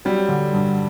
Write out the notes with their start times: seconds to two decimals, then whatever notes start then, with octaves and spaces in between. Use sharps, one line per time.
0.05 F#3 G3
0.29 D3
0.53 G2